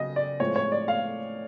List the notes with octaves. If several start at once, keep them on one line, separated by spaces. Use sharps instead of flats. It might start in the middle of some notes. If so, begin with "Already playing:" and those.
Already playing: C#3 F#3 D#5
D5
A2 F3 G#3 C4 C#5
C#5
D5
F5